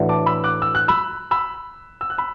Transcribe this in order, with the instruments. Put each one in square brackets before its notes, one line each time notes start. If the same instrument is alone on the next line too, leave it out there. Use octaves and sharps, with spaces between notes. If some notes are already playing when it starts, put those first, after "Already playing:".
Already playing: [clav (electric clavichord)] A2 E3 D4 F#4
[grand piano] A5 D6
B5 E6
D6 F#6
E6
F#6
B5 E6
B5 E6
E6
F#6
B5 E6